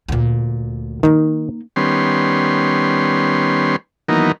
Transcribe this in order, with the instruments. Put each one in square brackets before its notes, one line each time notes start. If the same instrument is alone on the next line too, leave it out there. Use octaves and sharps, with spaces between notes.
[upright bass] D2 A#2
[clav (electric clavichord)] D#3 [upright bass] A#3 D#4
[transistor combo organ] D#3 G3 B3 C#4 C6
D#3 E3 F#3 A#3 B3 D#4